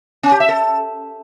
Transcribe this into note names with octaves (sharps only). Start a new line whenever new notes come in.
C#4
G4
E5
A4